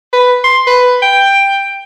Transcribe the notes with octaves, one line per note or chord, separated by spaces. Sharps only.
B4
C6
B4
G5